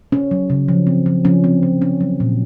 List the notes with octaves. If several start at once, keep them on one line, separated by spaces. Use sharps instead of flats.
C#4
F#3
C#3
F3
C4
F3
F3 C#4
C4
F3
C#4
F#3
A#2